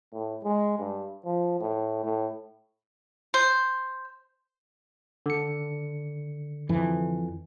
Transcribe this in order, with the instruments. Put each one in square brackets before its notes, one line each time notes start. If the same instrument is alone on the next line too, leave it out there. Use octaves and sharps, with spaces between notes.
[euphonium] A2
G#3
G2
F3
A2
A2
[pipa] C5
[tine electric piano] D3 C#7
[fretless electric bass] F2 E3